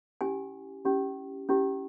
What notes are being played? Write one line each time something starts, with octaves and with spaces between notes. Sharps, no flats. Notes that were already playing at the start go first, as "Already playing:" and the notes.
C#4 E4 G4 G#5
C#4 E4 G4
C#4 E4 G4